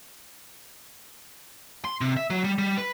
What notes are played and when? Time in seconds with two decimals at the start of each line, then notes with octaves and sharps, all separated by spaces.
1.85 C6
2.01 C3
2.17 E5
2.30 F#3
2.44 G3
2.58 G3
2.78 B4